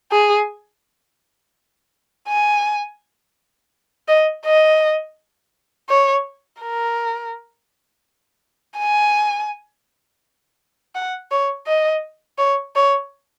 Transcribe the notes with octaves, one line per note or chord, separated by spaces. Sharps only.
G#4
G#5
D#5
D#5
C#5
A#4
G#5
F#5
C#5
D#5
C#5
C#5